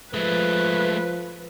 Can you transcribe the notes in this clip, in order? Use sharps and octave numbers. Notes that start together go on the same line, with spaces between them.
F3 G#3 A3 B4